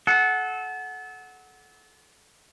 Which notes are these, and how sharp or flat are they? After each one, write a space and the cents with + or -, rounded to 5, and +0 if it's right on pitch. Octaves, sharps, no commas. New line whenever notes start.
A4 -30 F#5 +0